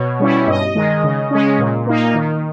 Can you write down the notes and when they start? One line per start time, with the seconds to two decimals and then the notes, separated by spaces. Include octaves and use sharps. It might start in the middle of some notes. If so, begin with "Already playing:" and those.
Already playing: B2 C#5
0.20 G3 C#4 E4
0.47 G2 D#5
0.75 D#3 G#3
1.03 C#3
1.31 G#3 C#4
1.59 A#2
1.86 A#3 D#4
2.15 D#3